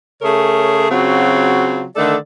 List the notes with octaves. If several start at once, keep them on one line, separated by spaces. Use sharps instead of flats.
C#3 A3 G#4 A#4 C#5
C#3 F#3 C4 F4 F#4
D3 D#3 A3 A4 D5